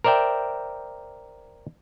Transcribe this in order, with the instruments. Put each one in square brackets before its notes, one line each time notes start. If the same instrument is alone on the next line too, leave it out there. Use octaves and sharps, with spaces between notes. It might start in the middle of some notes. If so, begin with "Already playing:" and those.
[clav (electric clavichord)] A#4 C5 D5 E5 G5